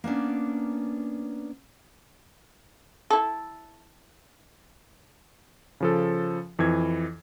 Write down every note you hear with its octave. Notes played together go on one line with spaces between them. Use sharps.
A#3 B3 C#4 D4
E4 A4
C#3 F3 A4
F2 E3 G#6